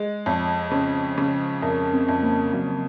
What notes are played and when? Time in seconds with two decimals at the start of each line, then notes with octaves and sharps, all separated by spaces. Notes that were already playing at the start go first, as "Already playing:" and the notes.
Already playing: G#3
0.26 F2 C#5
0.71 C#3 C5
1.18 C#3
1.62 F2 A#4
1.93 C4
2.08 F2
2.23 A#3
2.53 F2 F#3